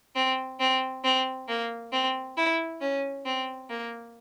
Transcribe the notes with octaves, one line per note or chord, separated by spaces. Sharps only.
C4
C4
C4
A#3
C4
E4
C#4
C4
A#3